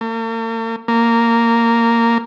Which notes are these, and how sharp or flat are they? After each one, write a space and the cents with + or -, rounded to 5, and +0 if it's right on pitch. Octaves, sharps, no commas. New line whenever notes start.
A#3 -45
A#3 -10